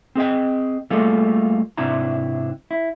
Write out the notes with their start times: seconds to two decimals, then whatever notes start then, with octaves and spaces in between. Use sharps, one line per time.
0.15 C4 G#4 D#5 G5
0.90 G3 A3 A#3 F4 G#4 A4
1.77 G#2 C3 D4 E4 A#5
2.71 E4